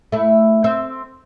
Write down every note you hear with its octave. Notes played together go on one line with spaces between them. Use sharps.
A3 E4
C4 E5